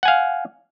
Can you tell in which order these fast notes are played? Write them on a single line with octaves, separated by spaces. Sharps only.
F#5 G#5 F5